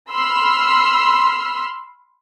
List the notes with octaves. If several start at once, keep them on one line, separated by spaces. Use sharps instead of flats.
B5 C6 E6 F6